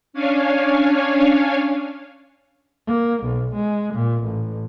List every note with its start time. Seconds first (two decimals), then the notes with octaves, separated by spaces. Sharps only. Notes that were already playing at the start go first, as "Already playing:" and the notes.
0.13 C#4 D4 C#5 F5 G#5
2.87 A#3
3.24 B1
3.55 G#3
3.94 A#2
4.24 A1